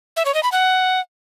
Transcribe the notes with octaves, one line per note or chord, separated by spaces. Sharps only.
E5
C#5
D#5
B5
F#5